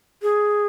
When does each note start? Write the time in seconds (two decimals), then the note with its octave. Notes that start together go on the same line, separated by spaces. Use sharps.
0.22 G#4